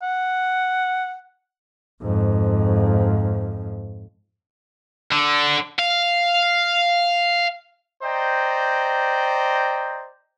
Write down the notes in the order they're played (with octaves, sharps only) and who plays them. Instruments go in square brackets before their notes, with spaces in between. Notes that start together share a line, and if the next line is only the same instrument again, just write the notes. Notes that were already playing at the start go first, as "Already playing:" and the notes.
[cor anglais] F#5
[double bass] F2 G#2
[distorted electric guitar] D3
F5
[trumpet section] C5 D5 D#5 G5 A#5